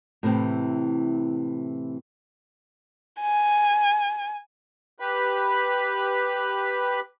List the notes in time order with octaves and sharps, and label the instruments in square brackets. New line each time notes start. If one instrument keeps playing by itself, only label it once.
[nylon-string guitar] A2 C3 E3 C4
[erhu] G#5
[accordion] G4 B4 B5